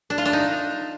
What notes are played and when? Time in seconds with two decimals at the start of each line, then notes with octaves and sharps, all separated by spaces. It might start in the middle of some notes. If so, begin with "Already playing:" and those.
0.10 D4
0.18 F4
0.26 D4
0.33 D#4